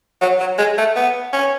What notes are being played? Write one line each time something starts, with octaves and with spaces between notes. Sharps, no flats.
F#3
F#3
G#3
A3
B3
C#4